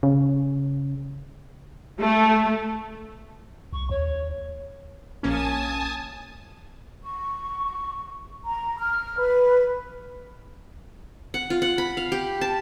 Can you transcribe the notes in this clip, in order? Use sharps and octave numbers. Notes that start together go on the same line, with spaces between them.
C#3
A3
C2 C#6
D#2 C#5
A#1 A#3 C#4 G#5 A5 D#6
C#6
A#5
F6
B4
F#5
F4
F#5
B5
F5
G4
A5